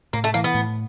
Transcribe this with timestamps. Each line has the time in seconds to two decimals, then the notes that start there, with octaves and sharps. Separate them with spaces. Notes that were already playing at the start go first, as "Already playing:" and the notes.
0.13 A2 A#3
0.24 A3
0.34 E3 A#3
0.44 B3
0.54 A2